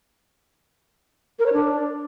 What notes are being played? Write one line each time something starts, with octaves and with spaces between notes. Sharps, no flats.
A#4
C#5
D4